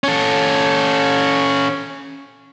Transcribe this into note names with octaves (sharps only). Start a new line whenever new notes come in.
C#4 A4